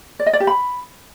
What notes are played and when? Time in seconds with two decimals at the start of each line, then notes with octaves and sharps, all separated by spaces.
0.19 D5
0.26 D#5
0.33 D5
0.40 G4
0.47 B5